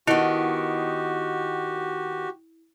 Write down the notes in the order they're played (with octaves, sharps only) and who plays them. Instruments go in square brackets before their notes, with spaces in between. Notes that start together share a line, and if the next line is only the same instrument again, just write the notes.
[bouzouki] D#3 B3 [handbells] E4 [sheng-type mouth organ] F#4 G4